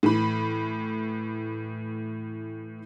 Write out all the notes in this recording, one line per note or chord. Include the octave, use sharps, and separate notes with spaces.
A2 E3 B5